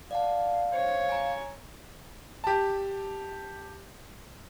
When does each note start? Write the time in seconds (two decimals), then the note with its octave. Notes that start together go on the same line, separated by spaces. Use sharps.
0.11 D5 F5 F#5 A5
0.73 C5 C#5
1.09 G#5 A#5
2.44 G4 A5